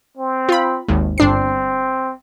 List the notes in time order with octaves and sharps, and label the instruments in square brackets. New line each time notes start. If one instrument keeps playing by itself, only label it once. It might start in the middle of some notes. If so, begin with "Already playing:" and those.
[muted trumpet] C4
[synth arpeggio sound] F4 B5
G#1 D#2
[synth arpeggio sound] G1 D4 C7 [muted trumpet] C4